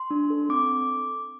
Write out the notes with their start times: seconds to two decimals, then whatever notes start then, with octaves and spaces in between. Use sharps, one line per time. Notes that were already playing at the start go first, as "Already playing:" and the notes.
Already playing: C6
0.11 D4
0.30 A4
0.49 C4 D6